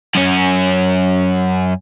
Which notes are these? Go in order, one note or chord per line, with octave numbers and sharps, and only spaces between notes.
F#2 C#4